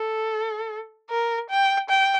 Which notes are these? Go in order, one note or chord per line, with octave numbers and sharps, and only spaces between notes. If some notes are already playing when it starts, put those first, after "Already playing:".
Already playing: A4
A#4
G5
G5